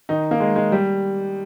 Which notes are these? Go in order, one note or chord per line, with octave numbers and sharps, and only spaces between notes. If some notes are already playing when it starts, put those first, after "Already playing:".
D#3 D#4
A#3
G#3
G#3
G3